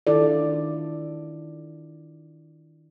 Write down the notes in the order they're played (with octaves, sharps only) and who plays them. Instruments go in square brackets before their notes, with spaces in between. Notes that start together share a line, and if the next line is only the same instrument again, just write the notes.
[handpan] D#3 D4 E4 F4 A4 D5